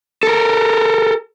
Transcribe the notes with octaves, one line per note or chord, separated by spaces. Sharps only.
A4 A#4